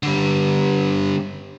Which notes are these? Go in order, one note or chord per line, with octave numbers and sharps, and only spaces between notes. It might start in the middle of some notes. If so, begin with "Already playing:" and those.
D3 G3